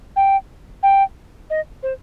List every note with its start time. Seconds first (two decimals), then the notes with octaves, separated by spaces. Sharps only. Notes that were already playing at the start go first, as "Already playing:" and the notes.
0.16 G5
0.83 G5
1.50 D#5
1.83 C5